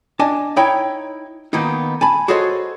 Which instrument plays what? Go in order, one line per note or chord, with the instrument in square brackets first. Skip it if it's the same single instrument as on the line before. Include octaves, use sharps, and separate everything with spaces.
[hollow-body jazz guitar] D4 D#5 G#5 A5
D#4 E4 C#5 G5 B5
D#3 A#3 B3 D#4
G#5 A5 B5
F#4 G#4 A4 C5 C#5 D#5